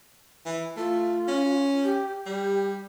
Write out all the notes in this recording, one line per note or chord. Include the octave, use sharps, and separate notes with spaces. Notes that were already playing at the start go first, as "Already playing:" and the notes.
E3
A3 F4
C#4
G4
G3 G4